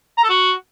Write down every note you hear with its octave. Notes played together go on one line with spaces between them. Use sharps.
A#5
A4
F#4